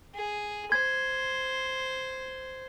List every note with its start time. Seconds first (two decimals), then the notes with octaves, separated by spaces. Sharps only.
0.15 G#4
0.72 C5 G#6